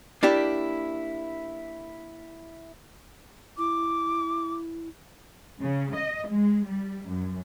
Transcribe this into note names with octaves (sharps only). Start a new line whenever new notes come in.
A#3 D4 E4 G4
E4 D6
C#3
D#5
G#3
G3
F#2